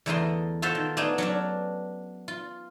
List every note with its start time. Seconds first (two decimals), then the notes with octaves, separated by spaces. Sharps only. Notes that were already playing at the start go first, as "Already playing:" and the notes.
0.06 E2 D3 A3 A#4 D#5 C6
0.62 F4 F#4 A4 C5 E5 F5
0.75 D#3
0.97 A3 B3 D4 D#4 G#4
1.18 F#3 C#4 D4
2.28 F4